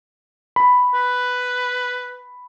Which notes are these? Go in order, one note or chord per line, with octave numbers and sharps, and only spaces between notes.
B5
B4